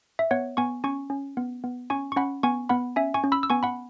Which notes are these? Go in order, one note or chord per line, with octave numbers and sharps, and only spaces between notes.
E5
B3 C#5 F#5
B3 G#5 C#6
C#4 G#5 C#6
C#4
B3
B3
C#4 G#5 C#6
C#6
C#4 F#5 B5
B3 G#5 C#6
B3 F#5 B5
C#4 E5 G#5
G#5 C#6
C#4
B5 E6
E6
B3 G#5 C#6
F#5 B5